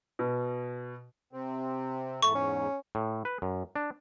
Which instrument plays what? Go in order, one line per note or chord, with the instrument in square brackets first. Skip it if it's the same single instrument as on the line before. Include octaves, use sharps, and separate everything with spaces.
[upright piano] B2
[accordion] C3 C4
[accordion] E2 G#2 [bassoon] A3 [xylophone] C#6
[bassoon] C#4
[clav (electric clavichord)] A2
B4
F#2
D4